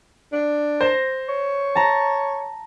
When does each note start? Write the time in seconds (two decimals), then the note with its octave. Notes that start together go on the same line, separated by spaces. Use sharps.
0.33 D4
0.81 C5 A#6 E7
1.29 C#5
1.75 A5 A#5